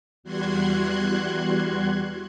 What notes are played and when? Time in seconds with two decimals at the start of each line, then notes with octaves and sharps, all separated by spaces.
0.23 E2 G3 F#4 C6 F#6 G#6